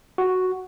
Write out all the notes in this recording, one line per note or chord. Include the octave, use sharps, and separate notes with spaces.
F#4